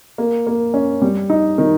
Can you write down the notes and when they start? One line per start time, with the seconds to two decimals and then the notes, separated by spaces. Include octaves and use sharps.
0.18 A#3
0.47 A#3
0.74 C#4
1.02 G3
1.30 D#4
1.58 D#3